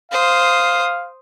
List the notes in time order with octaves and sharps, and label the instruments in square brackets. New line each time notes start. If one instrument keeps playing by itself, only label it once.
[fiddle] C5 D#6 [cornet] F5